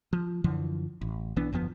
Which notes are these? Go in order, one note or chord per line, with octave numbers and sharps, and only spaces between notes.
F3
F#2 D3 E3 F3
A1
B1 E3 B3 D4
G1 F2 F3 B3